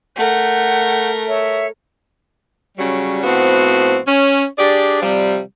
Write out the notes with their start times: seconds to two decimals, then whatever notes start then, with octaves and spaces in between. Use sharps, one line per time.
0.16 A3 A#4 F#5 G6
1.28 C#5 E5
2.77 C#3 F#3 G3
3.24 A2 F3 B3 C4 F#4
4.08 C#4
4.59 D4 G4 G#4 D5
5.02 C3 F3 G3